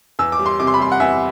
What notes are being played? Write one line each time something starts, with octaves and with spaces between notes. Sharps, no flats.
E2 E6
D6
G3
C6
C3 D6
C6
B5
G3 C6
F#5
E2 E5